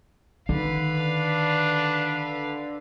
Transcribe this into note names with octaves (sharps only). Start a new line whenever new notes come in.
D3 D#3 B4 F5
D4